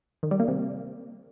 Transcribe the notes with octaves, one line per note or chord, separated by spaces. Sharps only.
D#3
G3
A#3
C3